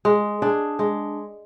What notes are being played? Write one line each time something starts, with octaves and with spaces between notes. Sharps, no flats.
G#3
D4 G#4
G#3